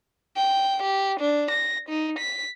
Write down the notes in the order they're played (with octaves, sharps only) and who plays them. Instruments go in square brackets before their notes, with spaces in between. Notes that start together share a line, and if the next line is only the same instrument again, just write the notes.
[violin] G5
G4
D4
A#6
D#4
B6